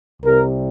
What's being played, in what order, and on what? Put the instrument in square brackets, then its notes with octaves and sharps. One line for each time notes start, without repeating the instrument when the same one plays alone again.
[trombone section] C2 C3 G3 A#4